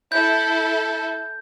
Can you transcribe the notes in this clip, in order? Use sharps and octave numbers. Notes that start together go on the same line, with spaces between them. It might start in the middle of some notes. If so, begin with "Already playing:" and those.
E4 A4 G6